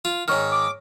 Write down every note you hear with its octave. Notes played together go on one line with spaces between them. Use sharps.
F4
G#2 D#3 C#5 C#6 F6
D6